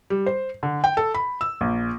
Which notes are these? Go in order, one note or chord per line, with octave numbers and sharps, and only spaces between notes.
G3
C5
D3
G5
A4
B5
E6
A#1